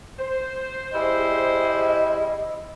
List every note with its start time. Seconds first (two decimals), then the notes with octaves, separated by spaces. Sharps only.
0.19 C5
0.92 G3 E4 G#4 D#5